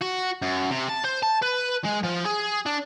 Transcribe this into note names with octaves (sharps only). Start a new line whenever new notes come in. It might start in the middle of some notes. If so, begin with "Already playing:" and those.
F#4
F#2
C3
A5
C5
A5
B4
G#3
F3
G#4
D4